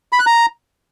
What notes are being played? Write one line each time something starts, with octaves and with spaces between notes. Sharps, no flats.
B5
F#6
A#5